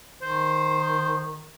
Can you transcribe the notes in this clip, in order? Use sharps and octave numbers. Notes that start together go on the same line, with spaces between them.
D#3 C5